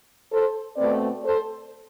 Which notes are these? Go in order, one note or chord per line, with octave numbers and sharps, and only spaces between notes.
A4 C5
B2 A3 C4 B4 D5
A4 C5